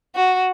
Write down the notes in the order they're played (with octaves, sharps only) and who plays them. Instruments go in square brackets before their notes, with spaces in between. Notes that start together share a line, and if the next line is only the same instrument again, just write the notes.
[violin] F#4